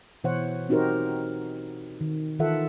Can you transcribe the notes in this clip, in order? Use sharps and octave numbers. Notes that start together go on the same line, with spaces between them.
B2 E3 C5 C#5 F#5
C4 D#4 F#4 G4 A#4 C5
D#3
D#3 E3 F4 A4 E5 F#5